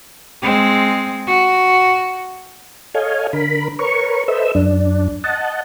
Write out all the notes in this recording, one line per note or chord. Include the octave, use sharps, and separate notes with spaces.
G#3 C4
F#4
A4 C#5 D#5 F5 G#5
D3 A#4 B5
A#4 B4 C#5 C#6
A4 B4 C5 D#5 E5 E6
F#2 D4
D#5 F#5 A5